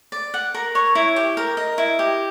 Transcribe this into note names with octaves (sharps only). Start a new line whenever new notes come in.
D5
F#5
A#4
C#5
E4
G4
A#4
D#5
E4
G4